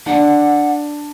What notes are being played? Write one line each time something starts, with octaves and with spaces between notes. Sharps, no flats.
D4 F#5